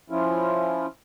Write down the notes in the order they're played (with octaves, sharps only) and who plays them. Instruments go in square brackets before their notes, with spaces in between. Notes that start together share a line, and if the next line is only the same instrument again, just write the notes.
[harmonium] F3 C#4 E4 F4